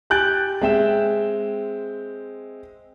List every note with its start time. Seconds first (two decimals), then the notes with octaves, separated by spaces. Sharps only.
0.10 G4 G#5 F#6 G6 A6 D7
0.61 G#3 C4 E5 G5 E7